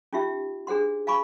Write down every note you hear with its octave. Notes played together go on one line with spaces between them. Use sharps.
C#4 D#4 F4 G4 E5
D4 G#4 C5 F#5 C6
F5 G#5 B5 C#6 D6